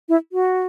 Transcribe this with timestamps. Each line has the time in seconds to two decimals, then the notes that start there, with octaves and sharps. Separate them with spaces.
0.09 E4
0.32 F#4